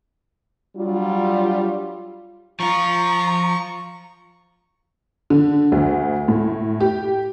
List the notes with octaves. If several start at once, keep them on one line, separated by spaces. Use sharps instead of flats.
F#3 G3 D4 F4
F3 F4 A#5 C#6
A#5
D3
D2
A2
G4